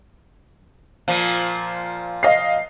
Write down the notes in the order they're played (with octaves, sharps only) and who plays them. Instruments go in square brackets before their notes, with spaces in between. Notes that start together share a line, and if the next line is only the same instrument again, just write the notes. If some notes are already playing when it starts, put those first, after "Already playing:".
[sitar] A#2 F3
[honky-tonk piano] D#5 F5 C7